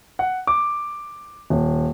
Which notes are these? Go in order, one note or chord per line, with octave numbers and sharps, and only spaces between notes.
F#5
D6
D#1